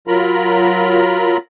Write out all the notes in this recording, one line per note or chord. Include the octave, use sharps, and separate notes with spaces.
F#3 F4 A#4 A#5 B5